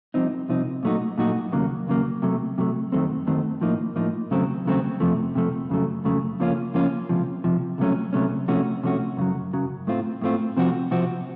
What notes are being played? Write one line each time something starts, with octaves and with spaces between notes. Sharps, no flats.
C2 C3 F3 C4 D#4
C2 C3 F3 C4 D#4
A#2 F#3 A3 D#4 F#4
A#2 F#3 A3 D#4 F#4
D#2 C#3 F#3 A#3
D#2 C#3 F#3 A#3
C3 F#3 A3
C3 F#3 A3
F#2 D#3 F#3 A3 C4
F#2 D#3 F#3 A3 C4
A2 F3 A#3 D#4
A2 F3 A#3 D#4
D#2 C#3 F#3 A3 C4
D#2 C#3 F#3 A3 C4
F2 C3 F3 A3
F2 C3 F3 A3
F2 C#3 F#3 A3
F2 C#3 F#3 A3
C#3 F3 A#3 C#4 F4
C#3 F3 A#3 C#4 F4
C#2 C3 F3
C#2 C3 F3
C#2 C3 F#3 A3 C#4
C#2 C3 F#3 A3 C#4
C3 F3 A3 C#4 F#4
C3 F3 A3 C#4 F#4
F#2 C#3 F#3
F#2 C#3 F#3
A2 A3 C4 F4
A2 A3 C4 F4
C3 F3 C4 F#4
C3 F3 C4 F#4